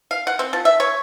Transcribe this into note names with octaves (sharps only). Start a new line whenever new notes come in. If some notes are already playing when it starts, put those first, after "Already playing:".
F5
F#5
C4
F3
E5
C#5